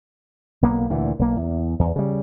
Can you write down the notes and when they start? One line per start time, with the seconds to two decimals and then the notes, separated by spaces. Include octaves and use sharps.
0.62 B1 A#3 B3
0.90 D2 A#2 E3
1.19 B1 A#3
1.36 E2
1.79 E2
1.96 C#3 G3